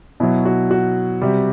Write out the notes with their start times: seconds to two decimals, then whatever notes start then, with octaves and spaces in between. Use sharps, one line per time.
0.20 B2 F#3 E4
0.45 F#4
0.71 F#4
1.22 C3 G3